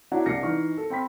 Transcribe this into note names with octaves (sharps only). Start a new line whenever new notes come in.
D4 E4 F#4 C#5 F#5 A#5
C2 D4 D5 A#6 C7 C#7
E3 D#4 C#6 F6
A4
C4 G5 B5 B6